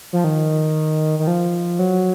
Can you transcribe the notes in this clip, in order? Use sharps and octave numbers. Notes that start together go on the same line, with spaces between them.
F3
D#3
D#3
F3
F#3